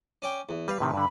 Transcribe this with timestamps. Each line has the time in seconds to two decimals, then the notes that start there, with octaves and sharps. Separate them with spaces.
0.22 C#4 D5 G5
0.49 E2
0.68 G3 B4 F5
0.80 A2 C3 D#3
0.94 G2 D3 B5